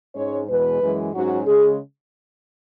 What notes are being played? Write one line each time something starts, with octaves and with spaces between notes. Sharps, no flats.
G#2 G#3 C#4 C#5
E2 B2 G#3 B4
F#2 E3 G#3
G#2 F#3 C#4 F#4
C#3 G#3 G#4